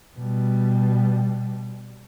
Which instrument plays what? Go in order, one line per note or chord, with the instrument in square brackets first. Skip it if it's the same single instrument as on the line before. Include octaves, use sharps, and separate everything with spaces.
[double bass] B2 G3